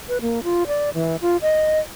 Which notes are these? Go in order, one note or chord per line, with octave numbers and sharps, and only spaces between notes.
B4
A#3
F4
D5
E3
F4
D#5